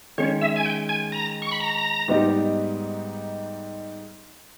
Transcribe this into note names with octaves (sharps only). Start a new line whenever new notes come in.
D#3 G#3 C#4 G#4 C#5
E5
G#5
G5
G#5
A#5
C#6
B5
A#5
G#2 G3 B3 D#4 G4